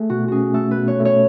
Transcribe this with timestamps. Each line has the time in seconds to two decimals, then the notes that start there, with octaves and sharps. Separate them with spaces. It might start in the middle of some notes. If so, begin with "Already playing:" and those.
Already playing: A3 G#4
0.10 B2 F#4
0.28 C#4 F#4 G#4
0.54 A3 A4
0.71 B4
0.78 B2
0.88 C#5
1.00 A3
1.05 C#5